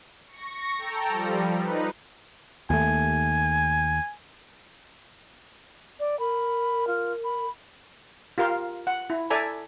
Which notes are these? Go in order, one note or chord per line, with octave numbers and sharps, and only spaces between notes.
C#6 A#6
A4 G5 A#5
F3 G3
D#4 B4
D#2 A3 G#5
D5
A#4 B5
F4
B5
F4 G4 A#4 F5 C6
F#5
E4
A4 D5 E5 G#5 A#5